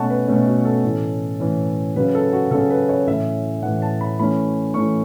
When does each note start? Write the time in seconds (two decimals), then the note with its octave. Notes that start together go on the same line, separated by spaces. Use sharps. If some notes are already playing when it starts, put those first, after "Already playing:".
Already playing: B2 A3 C#4 F#5 A5 C#6
0.10 B4
0.27 B2 A3 C#4 A4
0.47 F#4
0.65 A4
0.84 A2 E3 C#4
1.40 A2 E3 C#4
1.96 C#3 F#3 C#4 B4
2.15 A4
2.33 F#4
2.51 C#3 F#3 C#4 A4
2.70 B4
2.89 C#5
3.07 A2 E3 C#4 E5
3.62 A2 E3 C#4 F#5
3.82 A5
4.01 B5
4.19 E3 A3 C#4 B5
4.74 E3 A3 C#4 C#6